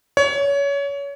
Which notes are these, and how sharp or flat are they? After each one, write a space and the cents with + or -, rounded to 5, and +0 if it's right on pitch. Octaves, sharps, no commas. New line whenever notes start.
C#5 +25